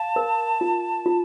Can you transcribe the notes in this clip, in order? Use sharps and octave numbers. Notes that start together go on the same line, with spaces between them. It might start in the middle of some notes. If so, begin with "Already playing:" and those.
Already playing: F5 A5
A#4
F4
F4